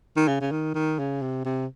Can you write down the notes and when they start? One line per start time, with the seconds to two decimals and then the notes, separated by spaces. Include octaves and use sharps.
0.17 D#3
0.28 C#3
0.41 C#3
0.52 D#3
0.75 D#3
0.99 C#3
1.22 C3
1.45 C3